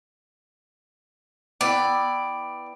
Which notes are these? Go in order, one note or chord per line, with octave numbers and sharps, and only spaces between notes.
B3 E4 D5 G5